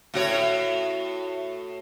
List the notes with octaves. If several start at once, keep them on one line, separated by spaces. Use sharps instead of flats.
A2 F#4 C#5